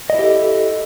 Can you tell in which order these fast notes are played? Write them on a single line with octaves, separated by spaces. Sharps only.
D#5 E4 G4 A4